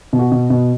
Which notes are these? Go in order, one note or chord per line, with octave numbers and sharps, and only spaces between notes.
B2
F#4
B2
B2